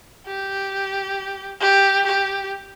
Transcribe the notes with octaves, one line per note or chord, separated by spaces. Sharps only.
G4
G4
G4